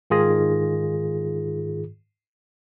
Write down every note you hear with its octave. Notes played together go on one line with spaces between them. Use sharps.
G#2 D#3 F4 G#4 A#6